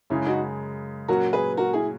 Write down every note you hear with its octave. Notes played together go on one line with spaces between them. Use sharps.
F#2 C#3 G#3 C#4 E4
D#4 F#4
A#2 F#3 C#4 F#4 A#4
G#4 B4
F#4 A#4
E4 G#4